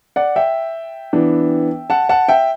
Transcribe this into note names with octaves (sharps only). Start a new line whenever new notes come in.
D5 F#5
E5 G5
E3 B3 D4
F#5 A5
F#5 A5
E5 G5